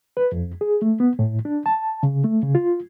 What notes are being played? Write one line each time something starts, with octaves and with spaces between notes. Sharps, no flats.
B4
F2
G#4
A3
B3
A2
D4
A5
C#3
A3
C#3
F4